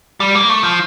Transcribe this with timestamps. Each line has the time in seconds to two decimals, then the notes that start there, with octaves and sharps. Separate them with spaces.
0.20 G3
0.35 A#3
0.49 A3
0.64 F3